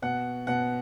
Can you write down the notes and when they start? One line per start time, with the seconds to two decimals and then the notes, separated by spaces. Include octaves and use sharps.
0.02 B2 F#5
0.47 B2 F#5